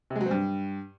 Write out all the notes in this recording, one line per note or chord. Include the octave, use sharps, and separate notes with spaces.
C3
G#3
F#3
C4
G2